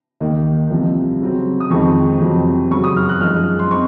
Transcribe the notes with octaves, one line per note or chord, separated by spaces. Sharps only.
D#2 D#3 A#3 D#4
C2 C3 F3
C#3 F#3 C4
D#6
F2 D#3 G#3 C4 D#4 C#6
F2 C3 F#3 C4
F#2 C#3 F#3 C#6
D#6
F6
F#6
F#2 F3 G#3 D#4 F6
C6
C4 D#4 C#6